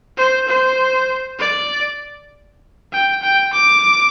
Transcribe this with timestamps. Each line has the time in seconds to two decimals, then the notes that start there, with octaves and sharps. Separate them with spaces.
0.17 C5
0.48 C5
1.39 D5
2.93 G5
3.22 G5
3.53 D6